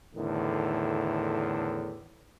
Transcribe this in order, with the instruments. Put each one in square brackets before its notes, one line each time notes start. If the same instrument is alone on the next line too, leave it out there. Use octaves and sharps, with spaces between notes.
[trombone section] E2 A2 D3 D#3